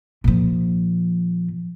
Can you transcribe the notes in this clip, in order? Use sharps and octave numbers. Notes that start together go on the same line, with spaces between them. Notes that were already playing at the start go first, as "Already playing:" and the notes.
A#2 F3